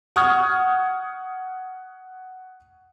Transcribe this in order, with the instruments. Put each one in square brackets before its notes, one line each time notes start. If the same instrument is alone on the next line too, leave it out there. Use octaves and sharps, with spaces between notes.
[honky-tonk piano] F#5 C#6 D#6 F6 G#6